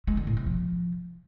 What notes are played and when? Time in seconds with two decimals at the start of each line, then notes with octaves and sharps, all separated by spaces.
0.07 G#3
0.17 D3
0.27 A2
0.37 C3
0.47 F3